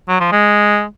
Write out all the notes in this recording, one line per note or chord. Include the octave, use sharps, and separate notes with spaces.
F#3
F3
G#3